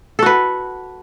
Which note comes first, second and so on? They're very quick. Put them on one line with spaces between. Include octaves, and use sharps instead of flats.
A4 F#4 B4